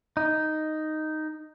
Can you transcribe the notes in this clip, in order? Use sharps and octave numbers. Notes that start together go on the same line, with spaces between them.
D#4